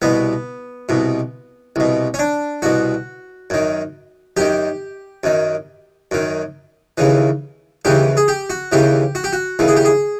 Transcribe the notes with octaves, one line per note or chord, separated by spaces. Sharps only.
C2 B2 B3
C2 B2
C2 B2
C#4
D4
C2 B2 F#4
F#2 D#3
F#2 D#3 G4
F#2 D#3
F#2 D#3
D#2 C#3 E3
D#2 C#3 E3 G4
G#4
G4
F#4
D#2 C#3 E3 G4
F#4
G4
F#4
D#2 C#3 E3
G#4
G4
G#4